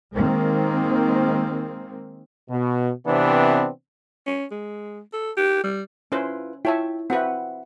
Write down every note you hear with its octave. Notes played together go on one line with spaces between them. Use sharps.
D#3 G#3 A#3 C4
B2
C3 E3 B3 C4 D4
C#4
G#3
A4
G4
G3
C#4 E4 F4 B4 C5
E4 F4 C#5 E5 G5 A5
C4 F#4 B4 E5 F#5